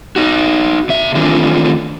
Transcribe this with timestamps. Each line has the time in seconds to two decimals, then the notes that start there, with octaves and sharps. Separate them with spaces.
0.16 D#4 F#4
0.89 B2 E5
1.15 D#3 E3 A3 C4 D4 F4